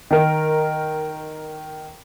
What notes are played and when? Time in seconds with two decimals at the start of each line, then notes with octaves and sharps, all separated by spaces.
0.11 D#3 A#4